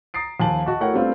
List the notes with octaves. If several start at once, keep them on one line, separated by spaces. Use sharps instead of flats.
A#5 D#6 A6 C7 D7
D#2 F3 G#5 A5 F#7
F#4 D#5 A5 C#6
A3 E4 A#4 C#5 F#5 G5
G3 A3 B3 C4 D4 F4